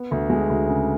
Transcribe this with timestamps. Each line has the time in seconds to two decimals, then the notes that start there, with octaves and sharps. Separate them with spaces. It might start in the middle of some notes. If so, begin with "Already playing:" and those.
Already playing: B3
0.11 D2
0.30 G#3
0.49 D2
0.68 C#3